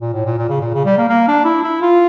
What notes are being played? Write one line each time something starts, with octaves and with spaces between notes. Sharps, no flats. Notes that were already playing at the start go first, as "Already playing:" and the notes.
A#2
A2
A#2
A#2
C#3
A#2
C#3
G3
A#3
A#3
D4
E4
E4
F4